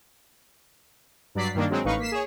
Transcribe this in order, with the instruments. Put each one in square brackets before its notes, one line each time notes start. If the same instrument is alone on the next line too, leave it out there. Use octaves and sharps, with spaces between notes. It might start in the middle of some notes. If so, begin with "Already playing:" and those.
[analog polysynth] G2 F#3 D5 B6 C7
G2 D#3 A#3 D4
F#3 G#3 C4
A1 D#4 B4 F5 C#6
A#3 B6 C7 E7
G#4 C#5